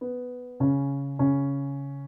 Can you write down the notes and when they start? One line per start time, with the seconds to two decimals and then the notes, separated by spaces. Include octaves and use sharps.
0.01 B3
0.60 C#3 C#4
1.19 C#3 C#4